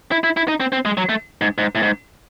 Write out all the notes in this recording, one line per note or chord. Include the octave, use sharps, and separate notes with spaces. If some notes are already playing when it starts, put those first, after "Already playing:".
E4
E4
E4
D#4
C4
C4
G#3
F#3
A3
G#2
G#2
A2
G#2